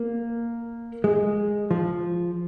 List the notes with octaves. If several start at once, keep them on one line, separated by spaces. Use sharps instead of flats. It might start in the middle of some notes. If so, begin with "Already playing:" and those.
Already playing: A#3
G#3
F3